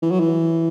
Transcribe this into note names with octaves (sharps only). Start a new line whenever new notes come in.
E3
F#3
E3